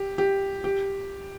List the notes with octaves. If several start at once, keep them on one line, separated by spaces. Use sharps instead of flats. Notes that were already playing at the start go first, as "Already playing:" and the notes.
Already playing: G4
G4
G4